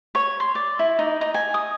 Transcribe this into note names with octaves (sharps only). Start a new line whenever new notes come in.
C#5
C6
D5
E4
D#4
D#4
G#5
D#6